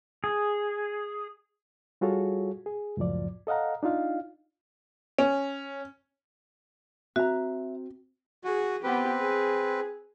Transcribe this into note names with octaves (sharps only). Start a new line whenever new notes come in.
G#4
G3 F4 F#4 G#4 A4 C#5
G#4
C#2 F#2 A2 F3 D5
A4 D#5 F5 F#5 A#5
D4 D#4 F4 F5
C#4
C4 F#4 E5 A#5
F#4 G#4
B3 C4 G4 B4
G#4